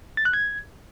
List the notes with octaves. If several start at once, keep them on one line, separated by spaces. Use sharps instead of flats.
A6
F#6
G#6